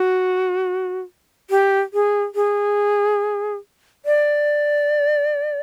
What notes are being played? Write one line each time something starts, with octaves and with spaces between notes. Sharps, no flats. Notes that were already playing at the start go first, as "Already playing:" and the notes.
Already playing: F#4
G4
G#4
G#4
D5